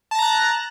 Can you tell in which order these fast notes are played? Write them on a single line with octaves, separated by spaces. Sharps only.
A5 A#6 A#5 F#6